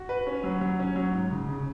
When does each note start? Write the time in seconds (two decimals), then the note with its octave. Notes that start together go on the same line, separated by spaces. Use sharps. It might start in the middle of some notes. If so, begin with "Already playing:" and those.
Already playing: F#4
0.09 B4
0.27 C#4
0.43 F#3
0.61 F#3
0.79 C#4
0.96 F#3
1.13 G#2
1.31 C#3
1.48 C#3